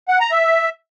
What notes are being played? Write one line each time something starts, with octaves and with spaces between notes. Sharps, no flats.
F#5
A#5
E5